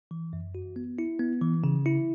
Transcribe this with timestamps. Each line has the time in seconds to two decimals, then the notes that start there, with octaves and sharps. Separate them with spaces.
0.11 E3
0.33 F#2
0.55 F#4
0.76 B3
0.99 E4
1.19 B3
1.41 E3
1.64 C#3
1.86 E4